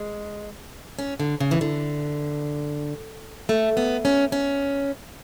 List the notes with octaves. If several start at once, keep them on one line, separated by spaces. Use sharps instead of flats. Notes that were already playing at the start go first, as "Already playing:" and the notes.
Already playing: G#3
C#4
D3
C#3
E3
D3
A3
B3
C#4
C#4